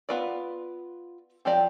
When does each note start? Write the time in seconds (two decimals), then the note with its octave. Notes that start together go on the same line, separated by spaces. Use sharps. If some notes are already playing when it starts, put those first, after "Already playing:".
0.09 B3 F4 B4 D5
1.45 F3 C4 G4 D5